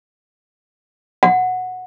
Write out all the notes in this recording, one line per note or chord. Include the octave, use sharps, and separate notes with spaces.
F#5